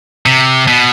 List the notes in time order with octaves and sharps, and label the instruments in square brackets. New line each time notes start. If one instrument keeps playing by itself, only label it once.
[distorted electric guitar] C3
B2